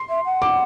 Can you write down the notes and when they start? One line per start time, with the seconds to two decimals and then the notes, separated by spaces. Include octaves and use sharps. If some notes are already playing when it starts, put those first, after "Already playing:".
Already playing: C6
0.09 E5
0.25 F#5
0.42 D6